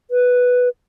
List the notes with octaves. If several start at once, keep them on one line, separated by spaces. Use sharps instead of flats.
B4